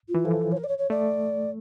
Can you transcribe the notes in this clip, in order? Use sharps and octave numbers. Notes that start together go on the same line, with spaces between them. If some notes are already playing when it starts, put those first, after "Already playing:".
F4
E3
F3 A4
C#5
A#4
D5
C#5
C#5
A3 D5